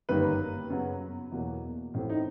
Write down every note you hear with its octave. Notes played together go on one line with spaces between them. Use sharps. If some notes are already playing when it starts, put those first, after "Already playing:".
G1 F#2 D#3 G3 A#3 B4
F#2 C#3 F#3 B3
E2 B2 F#3 A#3
A1 A2 E3 A3 C4
D#4